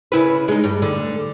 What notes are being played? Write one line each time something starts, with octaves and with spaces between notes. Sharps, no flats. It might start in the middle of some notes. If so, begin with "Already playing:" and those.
C#3 E4 B4
G#3 D#4
G2
D2 D3